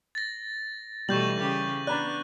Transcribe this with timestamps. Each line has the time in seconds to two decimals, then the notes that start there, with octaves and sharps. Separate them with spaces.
0.15 A6 A#6
1.09 B2 E3 G3 A3 C#6 G6 F#7
1.39 C#3 G4
1.87 B3 D4 D5 A#5 B5 F#6